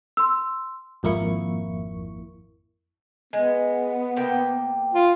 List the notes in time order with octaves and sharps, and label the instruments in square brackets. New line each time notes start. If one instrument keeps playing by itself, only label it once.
[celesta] C6 E6
[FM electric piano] G#1 F2 A#3 E4 C#6
[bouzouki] G#3 [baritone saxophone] B3
[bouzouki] C3 A#3 G5
[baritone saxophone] F4